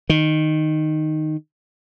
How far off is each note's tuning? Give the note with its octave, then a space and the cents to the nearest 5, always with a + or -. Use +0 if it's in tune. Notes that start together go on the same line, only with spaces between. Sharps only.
D#3 -5